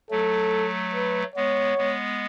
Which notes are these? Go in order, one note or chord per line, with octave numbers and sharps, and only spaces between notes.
F#3 A3 A4
B4
G#3 B3 C#5
G#3 B3